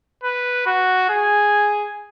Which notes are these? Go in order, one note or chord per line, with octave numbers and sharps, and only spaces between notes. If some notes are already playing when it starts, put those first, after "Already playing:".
B4
F#4
G#4